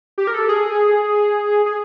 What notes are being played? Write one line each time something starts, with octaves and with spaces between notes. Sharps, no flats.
G4
A#4
A4
G#4
G#4